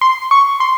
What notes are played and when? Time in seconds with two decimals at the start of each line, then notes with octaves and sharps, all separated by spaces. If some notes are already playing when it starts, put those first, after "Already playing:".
0.01 C6
0.31 C#6
0.60 C6